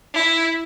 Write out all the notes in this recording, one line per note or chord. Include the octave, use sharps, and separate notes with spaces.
E4